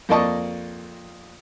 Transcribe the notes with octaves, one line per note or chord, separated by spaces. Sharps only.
F2 A#3 D5 D#5 A5 C#6